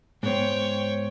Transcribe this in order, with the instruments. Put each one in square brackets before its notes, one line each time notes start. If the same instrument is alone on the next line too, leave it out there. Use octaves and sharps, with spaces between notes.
[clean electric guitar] G#2 B3 C5 [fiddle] C#5 G5